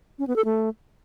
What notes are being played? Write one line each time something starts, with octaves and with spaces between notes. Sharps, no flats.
C#4
B3
A4
A3